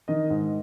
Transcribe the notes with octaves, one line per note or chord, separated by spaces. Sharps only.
D#3 D#5
G#2